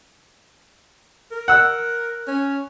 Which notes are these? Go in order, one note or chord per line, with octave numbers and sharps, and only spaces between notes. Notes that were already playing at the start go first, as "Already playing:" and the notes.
A#4
F#5 E6
C#4